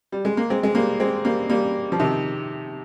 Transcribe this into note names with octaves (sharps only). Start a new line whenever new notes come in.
G3
G#3
A#3
G#3 C4
G#3
G3 A#3
G#3 C4
G3 A#3
G3 A#3
F3
C3 D#3